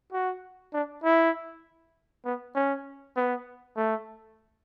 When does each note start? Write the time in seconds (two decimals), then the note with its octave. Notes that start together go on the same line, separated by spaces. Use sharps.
0.13 F#4
0.73 D4
1.04 E4
2.25 B3
2.55 C#4
3.16 B3
3.77 A3